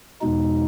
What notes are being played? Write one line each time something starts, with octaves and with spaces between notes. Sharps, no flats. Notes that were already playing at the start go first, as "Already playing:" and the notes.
E2 B2 G#3 D#4